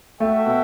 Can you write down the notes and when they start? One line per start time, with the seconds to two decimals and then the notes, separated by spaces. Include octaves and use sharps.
0.20 A3 F#4 A4 E5 G5
0.46 B2